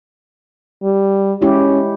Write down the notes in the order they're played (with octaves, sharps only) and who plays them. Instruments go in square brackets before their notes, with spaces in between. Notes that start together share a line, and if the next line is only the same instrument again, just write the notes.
[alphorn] G3
[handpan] G#3 E4 G4 [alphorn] C#4